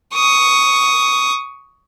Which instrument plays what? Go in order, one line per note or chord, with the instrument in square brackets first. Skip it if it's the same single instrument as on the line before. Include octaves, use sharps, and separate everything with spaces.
[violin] C#6 D#6